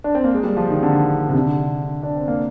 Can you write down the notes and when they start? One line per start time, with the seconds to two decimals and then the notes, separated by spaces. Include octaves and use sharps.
0.04 D4
0.15 C4
0.24 A#3
0.34 G#3
0.44 G3
0.57 F3
0.70 D#3
0.83 D3
1.29 C3
1.35 D3
2.03 D4
2.15 C4
2.28 A#3